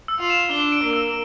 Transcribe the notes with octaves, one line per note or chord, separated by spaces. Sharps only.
E6
F4
E7
D4 G7
D7
A#3
E6